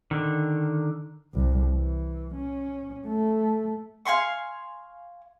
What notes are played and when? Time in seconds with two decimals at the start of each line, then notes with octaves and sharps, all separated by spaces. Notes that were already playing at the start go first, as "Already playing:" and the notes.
0.11 D3 D#3
1.34 C2
1.73 E3
2.34 C#4
3.08 A3
4.05 F5 G#5 C6 C#6